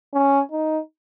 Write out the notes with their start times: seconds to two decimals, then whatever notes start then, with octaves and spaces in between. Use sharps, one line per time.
0.14 C#4
0.51 D#4